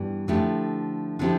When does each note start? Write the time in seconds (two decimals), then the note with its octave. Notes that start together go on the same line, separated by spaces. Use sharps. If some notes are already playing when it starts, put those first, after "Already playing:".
Already playing: G2 E3 G3 B3
0.28 D3 F3 A3 E4 G4
1.19 D3 F3 C4 E4 G4